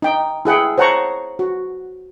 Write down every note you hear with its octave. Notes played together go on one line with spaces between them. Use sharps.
D#4 G5
E4 G#4 F#5 G5
C5 C#5 F#5 A5 A#5 C#6
F#4